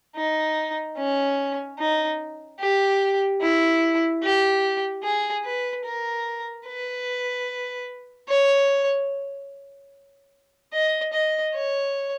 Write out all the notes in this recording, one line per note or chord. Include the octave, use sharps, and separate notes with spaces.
D#4
C#4
D#4
G4
E4
G4
G#4
B4
A#4
B4
C#5
D#5
D#5
C#5